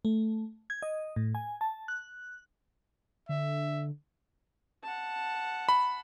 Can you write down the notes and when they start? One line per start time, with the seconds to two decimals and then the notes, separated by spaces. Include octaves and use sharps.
0.05 A3
0.70 G#6
0.82 D#5
1.16 A2
1.35 G#5
1.61 A5
1.88 F#6
3.29 D3 E5
4.83 F#5 A5
5.69 B5